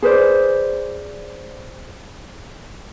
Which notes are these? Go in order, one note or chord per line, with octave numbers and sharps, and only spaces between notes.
G#4 B4 C5 D5